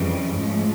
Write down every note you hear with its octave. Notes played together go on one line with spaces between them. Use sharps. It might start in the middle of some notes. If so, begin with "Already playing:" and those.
Already playing: F2 C#3 E3 G3
G#2 F3 A3